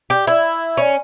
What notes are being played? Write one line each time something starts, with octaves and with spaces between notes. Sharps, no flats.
G4
E4
C#4